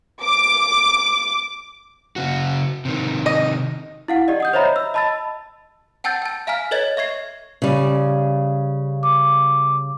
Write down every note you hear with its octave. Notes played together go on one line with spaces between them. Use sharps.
D6
C#3 F#4
C3 D#3
D#5
E4 F5 F#5
G4 D5 D#5
F#5 D#6 G6
C5 C#5 D#5 E5 A#5 B5
E6
D#5 A5 B5 E6 A6
F#5 G5 A5 E6 G6 A6
G5 A5
E5 F5 G#5 A#5 F6 B6
A4 B4 C#5 D#5 G#6 A6
E5 C#6 G#6 C7
C#3 G3
D6